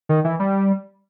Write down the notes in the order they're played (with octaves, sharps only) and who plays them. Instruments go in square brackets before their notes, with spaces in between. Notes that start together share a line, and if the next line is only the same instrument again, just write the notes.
[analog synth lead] D#3
E3
G3